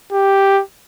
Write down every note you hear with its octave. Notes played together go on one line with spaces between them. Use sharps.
G4